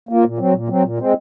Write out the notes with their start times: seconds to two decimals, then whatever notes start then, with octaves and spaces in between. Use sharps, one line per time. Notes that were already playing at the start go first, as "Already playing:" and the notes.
0.09 A#3 F4
0.24 A#2
0.39 F#3 C4
0.54 A#2
0.69 F#3 C4
0.84 A#2
0.98 G#3 C4